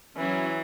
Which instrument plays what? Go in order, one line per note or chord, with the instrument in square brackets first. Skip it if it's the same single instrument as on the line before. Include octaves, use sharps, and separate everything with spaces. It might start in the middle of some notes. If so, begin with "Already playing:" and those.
[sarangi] E3 [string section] F#3 C#4 E4